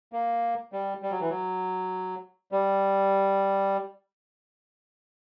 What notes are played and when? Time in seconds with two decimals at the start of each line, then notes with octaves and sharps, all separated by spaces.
0.13 A#3
0.73 G3
1.03 G3
1.11 F#3
1.21 E3
1.29 F#3
2.52 G3